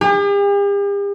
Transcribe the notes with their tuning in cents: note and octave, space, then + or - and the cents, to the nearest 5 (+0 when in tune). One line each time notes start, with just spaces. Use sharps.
G4 +45